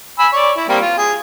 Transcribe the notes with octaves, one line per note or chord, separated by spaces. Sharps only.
G#5 B5 E6
C#5 D5
E4
G3 A#3 C4
F4
G#4